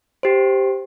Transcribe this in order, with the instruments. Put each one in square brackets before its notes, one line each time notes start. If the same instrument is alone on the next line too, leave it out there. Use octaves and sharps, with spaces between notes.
[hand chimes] G4 C5